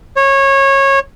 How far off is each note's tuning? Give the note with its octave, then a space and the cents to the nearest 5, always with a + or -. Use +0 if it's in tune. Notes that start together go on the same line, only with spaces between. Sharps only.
C#5 -20